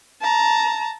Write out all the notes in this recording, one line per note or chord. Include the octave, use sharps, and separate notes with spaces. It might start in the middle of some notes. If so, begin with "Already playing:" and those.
A5 A#5